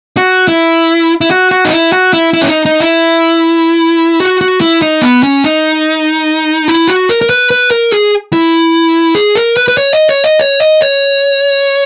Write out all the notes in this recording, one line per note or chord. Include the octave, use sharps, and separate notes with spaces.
F#4
E4
E4
F#4
F#4
D#4
E4
F#4
E4
E4
C#4
D#4
D#4
E4
F#4
F#4
E4
D#4
B3
C#4
D#4
E4
F#4
A#4
A#4
B4
B4
A#4
G#4
E4
G#4
A#4
B4
B4
C#5
D#5
C#5
D#5
C#5
D#5
C#5